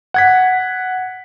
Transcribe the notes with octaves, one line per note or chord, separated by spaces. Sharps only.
F#5 G#6 B6